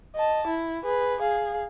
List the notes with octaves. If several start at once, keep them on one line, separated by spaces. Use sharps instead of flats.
D#5 A5
E4
G#4 B4
G#4 F5